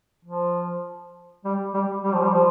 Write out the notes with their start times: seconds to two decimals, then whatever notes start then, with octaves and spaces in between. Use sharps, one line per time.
0.25 F3
1.45 G3
1.74 G3
2.04 G3
2.13 F3
2.23 G3
2.34 F3